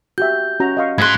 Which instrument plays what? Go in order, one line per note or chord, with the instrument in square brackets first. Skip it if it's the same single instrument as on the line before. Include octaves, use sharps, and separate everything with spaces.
[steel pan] F#4 G4 E5 [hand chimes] G6
[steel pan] C#4 F#4 A#5
D#5 F5 C#6
[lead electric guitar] G#2 C6 [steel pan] B5 [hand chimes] F#6 G#6